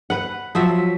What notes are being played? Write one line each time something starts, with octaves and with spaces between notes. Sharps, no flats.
B4 F#5
F3 F#3 E5